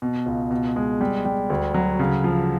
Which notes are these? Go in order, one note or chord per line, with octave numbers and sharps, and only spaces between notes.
B2
C#2
B2
G#3
G3
G3
D2
F#3
C#3
F3